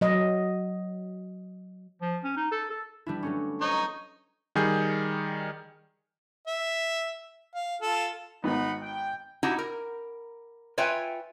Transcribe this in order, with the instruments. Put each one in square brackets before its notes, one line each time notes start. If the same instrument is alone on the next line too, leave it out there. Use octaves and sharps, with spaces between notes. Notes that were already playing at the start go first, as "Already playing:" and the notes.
[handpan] F#3 D#5
[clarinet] F3
C#4
D#4
A4
A4
[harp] G3 D4 E4
F#3 A3 C#4
[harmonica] D#4 C#5 [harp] C5
[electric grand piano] D#3 G3 G#4 G6
[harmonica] E5
F5
F4 A4
[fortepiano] G#1 D#3 B3 [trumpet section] D#4 F#5 B5
[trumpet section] G5
[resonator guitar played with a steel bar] D#4 E4 F#4 G4
A#4
F4 B4 C#5 E5 G5 G#5